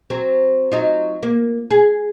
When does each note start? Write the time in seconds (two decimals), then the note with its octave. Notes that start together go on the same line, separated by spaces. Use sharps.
0.10 F#3 C4
0.72 F#3 D#4 F4
1.23 A#3
1.71 G#4